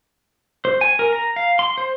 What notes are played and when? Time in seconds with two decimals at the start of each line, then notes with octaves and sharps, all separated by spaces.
0.65 C5
0.81 G#5
0.99 A#4
1.13 A#5
1.36 F5
1.59 C6
1.78 C5